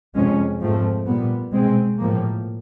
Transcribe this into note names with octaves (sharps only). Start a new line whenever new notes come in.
F2 C3 F3 G#3 C#4
G#2 F3 A3 C4
A#2 G3 B3
B2 G#3 C4
A2 F3 A#3